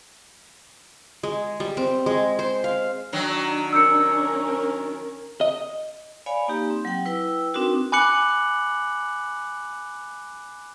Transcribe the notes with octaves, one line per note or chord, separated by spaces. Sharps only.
G#3
G3
C4
G#3
C5
F5
D#3 F#3 D4
C#4 A#4 E6 G6 C#7
D#5
C#5 D5 F5 G#5 B5
A#3 D#4 G4
C4
F#3 F#5 G5
E4 B4 G5 E6
C4 D4 D#4 F#4 A#4
G#5 B5 D6 F#6 C#7 F#7